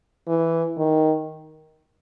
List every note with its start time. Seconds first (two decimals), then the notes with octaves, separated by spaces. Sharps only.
0.28 E3
0.77 D#3